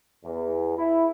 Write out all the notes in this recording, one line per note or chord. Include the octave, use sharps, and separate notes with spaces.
E2
E4